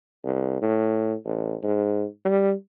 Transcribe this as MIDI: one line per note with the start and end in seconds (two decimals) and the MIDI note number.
0.25 0.62 36
0.62 1.14 45
1.25 1.55 33
1.63 2.05 44
2.25 2.53 55